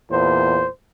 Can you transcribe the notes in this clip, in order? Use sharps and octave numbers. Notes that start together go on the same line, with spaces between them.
E2 A#2 C5